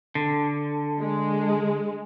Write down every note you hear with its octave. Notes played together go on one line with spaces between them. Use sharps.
D3
G#3